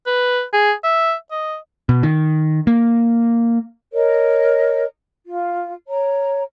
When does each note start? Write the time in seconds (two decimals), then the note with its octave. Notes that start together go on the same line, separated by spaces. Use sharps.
0.06 B4
0.53 G#4
0.84 E5
1.31 D#5
1.89 B2
2.03 D#3
2.67 A#3
3.93 A#4 C#5 D#5
5.27 F4
5.87 C#5 A#5